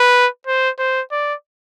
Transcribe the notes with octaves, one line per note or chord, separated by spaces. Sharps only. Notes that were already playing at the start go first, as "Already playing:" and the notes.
Already playing: B4
C5
C5
D5